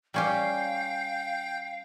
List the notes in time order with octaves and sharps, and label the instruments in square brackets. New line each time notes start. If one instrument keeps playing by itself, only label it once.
[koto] G3 C#4 G4 [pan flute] F5 [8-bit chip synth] G5